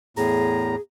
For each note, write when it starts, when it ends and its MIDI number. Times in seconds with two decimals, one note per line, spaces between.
0.17 0.76 40
0.17 0.76 45
0.17 0.81 68
0.17 0.76 82